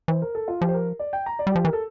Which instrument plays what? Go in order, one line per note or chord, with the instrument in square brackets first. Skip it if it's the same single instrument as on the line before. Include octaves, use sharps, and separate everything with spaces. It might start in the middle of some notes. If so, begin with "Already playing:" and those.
[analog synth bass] E3 [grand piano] C5
[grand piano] A#4
A4
F4
[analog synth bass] F3 [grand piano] G4
[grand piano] C5
A#4
D5
G5
A#5
D5
[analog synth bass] G3
[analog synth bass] F3 [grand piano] G4
[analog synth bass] E3 [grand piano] A#4
[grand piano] A4